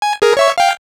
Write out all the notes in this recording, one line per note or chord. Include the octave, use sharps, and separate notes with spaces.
G#5
G#4 A#4
C#5 E5 C#6
F5 G5